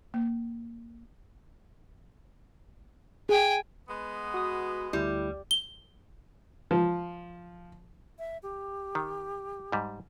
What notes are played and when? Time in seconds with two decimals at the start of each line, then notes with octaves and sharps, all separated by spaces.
0.14 A#3
3.29 G#4 G5 G#5
3.89 G#3 B3
4.34 F#4 D#6
4.93 D2 G3 E4
5.51 G7
6.71 F3
8.19 E5
8.43 G4
8.95 D#3
9.72 G#2 G3